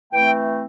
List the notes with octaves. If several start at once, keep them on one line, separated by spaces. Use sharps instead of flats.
E3 A3 C4 G5